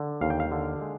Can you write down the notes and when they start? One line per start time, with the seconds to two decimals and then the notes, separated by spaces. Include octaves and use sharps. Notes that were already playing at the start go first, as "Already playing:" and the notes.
Already playing: D3
0.21 D#2 F5
0.30 G5
0.40 F5
0.52 D3
0.81 G#3